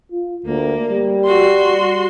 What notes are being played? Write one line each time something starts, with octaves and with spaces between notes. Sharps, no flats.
F4
D2 A#3
G3
F#4 C6